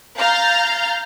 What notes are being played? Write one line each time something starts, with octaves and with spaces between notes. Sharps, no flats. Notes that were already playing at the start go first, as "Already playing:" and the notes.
F5 A#5 F6 G6 A6